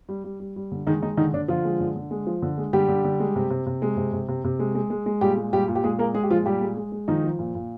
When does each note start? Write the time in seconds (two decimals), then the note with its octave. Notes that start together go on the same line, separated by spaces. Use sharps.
0.09 G3
0.24 G3
0.40 G3
0.56 G3
0.72 D3
0.87 D#3 G#3 D#4
1.02 D#3 G#3 D#4
1.17 D3 D#3 D#4
1.33 D3 D4
1.48 D3 F3 F4
1.65 G#3
1.80 D3
1.96 D3
2.11 G#3
2.27 F3
2.42 D3
2.58 G#3
2.73 D3 G3 G4
2.89 D3
3.04 D3
3.20 G#3
3.36 C3
3.50 C3
3.66 C3
3.82 G#3
3.97 C3
4.13 C3
4.28 C3
4.44 C3
4.59 G#3
4.75 G#3
4.90 G#3
5.06 G#3
5.21 A#2 G3 G4
5.37 G#3
5.53 A#2 G3 G4
5.68 A#2
5.75 G4
5.84 A#2 G#3 G#4
5.99 G#3 A#3 A#4
6.14 G#3 G#4
6.23 G4
6.30 A#2 F3 F4
6.46 A#2 G3 G4
6.61 G#3
6.77 G#3
6.92 G#3
7.08 D#3 F3 D#4
7.24 F3
7.39 A#2
7.55 A#2